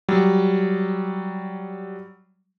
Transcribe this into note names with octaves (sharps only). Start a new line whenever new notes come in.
F#3 G3